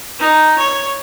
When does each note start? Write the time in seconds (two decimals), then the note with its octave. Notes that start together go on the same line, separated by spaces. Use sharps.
0.20 D#4
0.58 C#5